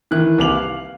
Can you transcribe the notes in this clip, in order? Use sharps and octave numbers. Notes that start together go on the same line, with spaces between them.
D#3 E3 F#6
C2 A#3 B4 D6 F7 F#7
F5